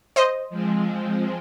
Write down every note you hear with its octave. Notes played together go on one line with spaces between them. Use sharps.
C5 D#5
F3 G#3 C4